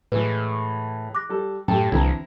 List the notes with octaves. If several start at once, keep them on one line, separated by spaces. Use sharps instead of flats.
A2 E3 G#3 B4
D6 F#6 A#6
G3 A4
F#2 A2 G4 A4 G5 A5
C2 D3 E3 C4 E4 A5 A#5 G#6